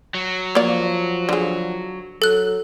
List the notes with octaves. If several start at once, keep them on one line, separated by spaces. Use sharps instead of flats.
F#3
F3 A#3 D5
D3 G#4
F#3 A4 F#6